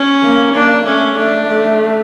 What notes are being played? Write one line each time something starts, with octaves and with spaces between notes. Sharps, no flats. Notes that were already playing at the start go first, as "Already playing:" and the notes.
Already playing: C#4
A#3
A#3 D4
A3 C#4
A3 D4
A3